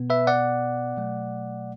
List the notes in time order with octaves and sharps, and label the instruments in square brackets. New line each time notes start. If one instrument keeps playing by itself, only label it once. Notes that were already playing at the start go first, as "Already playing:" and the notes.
Already playing: [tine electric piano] B2 B3
B4 E5
D5 F#5
B2 F#3 A3